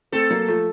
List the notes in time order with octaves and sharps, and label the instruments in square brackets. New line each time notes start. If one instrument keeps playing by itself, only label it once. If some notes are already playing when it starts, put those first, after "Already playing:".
[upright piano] A3 C4 [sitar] A4
[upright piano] F#3 A#3
F3 A3